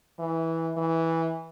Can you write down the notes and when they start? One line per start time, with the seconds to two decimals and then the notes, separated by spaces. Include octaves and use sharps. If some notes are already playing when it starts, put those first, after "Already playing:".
0.19 E3
0.77 E3